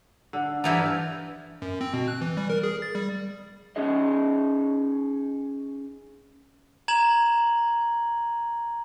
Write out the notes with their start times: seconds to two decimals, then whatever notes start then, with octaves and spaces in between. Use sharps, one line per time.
0.33 D3
0.64 G2 E3 F3 D#4 D5 E5
1.62 F#2
1.81 C4
1.93 B2
2.08 F#6
2.21 E3
2.37 G3
2.50 A#4
2.63 G#4
2.82 A6
2.95 G3
3.76 C#4 D#4 G#4 D#5
6.88 A#5 G#6 E7 F#7